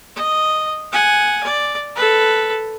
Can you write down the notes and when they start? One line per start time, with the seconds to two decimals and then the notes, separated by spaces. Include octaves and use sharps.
0.16 D#5
0.92 F#5 G#5
1.44 D5
1.96 A4 B4